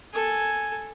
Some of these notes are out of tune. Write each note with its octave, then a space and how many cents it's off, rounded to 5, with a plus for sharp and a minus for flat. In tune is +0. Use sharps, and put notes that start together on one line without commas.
A4 +0 G#5 +0